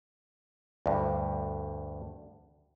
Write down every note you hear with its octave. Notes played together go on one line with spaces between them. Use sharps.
D2 G2